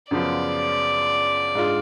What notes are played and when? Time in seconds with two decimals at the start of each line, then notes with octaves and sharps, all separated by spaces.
0.11 F#2 C#3 F3 B3 F4 D5
1.55 G#2 G#3 D4 F4